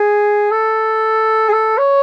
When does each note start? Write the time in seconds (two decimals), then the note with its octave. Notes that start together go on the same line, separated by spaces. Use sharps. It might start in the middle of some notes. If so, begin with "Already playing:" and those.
Already playing: G#4
0.51 A4
1.49 G#4
1.53 A4
1.78 C#5